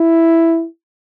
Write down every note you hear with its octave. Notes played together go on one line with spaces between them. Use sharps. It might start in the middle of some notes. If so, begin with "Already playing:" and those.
Already playing: E4